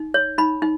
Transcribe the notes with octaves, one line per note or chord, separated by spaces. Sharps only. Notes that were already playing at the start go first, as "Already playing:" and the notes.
Already playing: D#4
C#5
D#4 B5
D#4